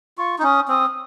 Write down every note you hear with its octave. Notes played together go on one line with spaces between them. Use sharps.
F4 C#6
D#4
C#4 D#6
C4 D#6